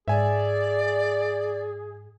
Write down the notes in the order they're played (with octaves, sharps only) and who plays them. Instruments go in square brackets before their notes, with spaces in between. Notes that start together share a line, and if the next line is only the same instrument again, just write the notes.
[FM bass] G#2 [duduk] G#4 [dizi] D5 [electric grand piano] E5 G#5